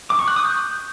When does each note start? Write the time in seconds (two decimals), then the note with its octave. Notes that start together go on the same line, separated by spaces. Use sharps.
0.10 D6
0.19 C#6
0.28 F#6
0.36 D#6
0.45 G6